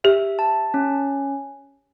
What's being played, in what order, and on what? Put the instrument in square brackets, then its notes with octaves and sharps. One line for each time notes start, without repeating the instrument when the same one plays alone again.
[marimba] G4 [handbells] E5
[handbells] A5
C#4